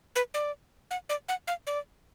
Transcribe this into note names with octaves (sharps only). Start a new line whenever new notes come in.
B4
D5
F#5
D5
F#5
F5
D5